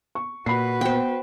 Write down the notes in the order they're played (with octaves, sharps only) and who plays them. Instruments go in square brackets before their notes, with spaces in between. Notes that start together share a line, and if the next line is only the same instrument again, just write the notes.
[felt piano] C#6
[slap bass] A#2 [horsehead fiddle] F#4 B4 [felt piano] B5 C7
[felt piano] B3 [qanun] C5 G5